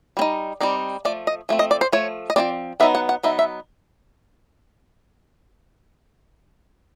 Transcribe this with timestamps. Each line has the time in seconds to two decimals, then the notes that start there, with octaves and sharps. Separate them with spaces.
0.17 G3 C4
0.22 D#4
0.61 G3 C4 D#4 D5
1.05 F3 A3 D5
1.27 D#5
1.49 F3 A3 C4
1.59 D#5
1.71 D5
1.81 C5
1.92 F3 A3 C#5
2.30 D#5
2.36 F3 A3 C4 D5
2.80 F#3 B3 D#4 E5
2.95 F#5
3.09 F#5
3.23 F#3 B3 D#4 E5
3.39 E5